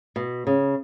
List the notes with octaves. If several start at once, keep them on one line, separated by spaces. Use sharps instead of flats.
B2
C#3